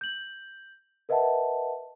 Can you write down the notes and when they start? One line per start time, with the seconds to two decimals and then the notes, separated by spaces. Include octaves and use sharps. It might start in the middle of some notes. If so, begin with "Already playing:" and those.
0.01 G6 F#7
1.09 A#4 B4 D#5 E5 F#5 A5